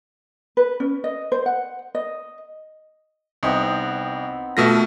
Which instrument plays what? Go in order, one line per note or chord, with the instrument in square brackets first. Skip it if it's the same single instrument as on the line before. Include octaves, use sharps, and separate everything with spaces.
[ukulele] B4
C#4
D#5
C5
F#5
D#5
[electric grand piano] C2 [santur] B3 C4 D#4
[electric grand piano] B2 A3 A#6 [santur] F4 A#4 E5